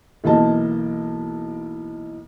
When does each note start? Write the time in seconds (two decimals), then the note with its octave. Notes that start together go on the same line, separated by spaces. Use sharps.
0.24 B1 E3 A#3 D#5 A5